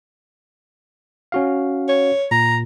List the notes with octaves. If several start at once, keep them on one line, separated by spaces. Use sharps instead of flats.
C#4 F#4 F5
C#5
A#2 A#5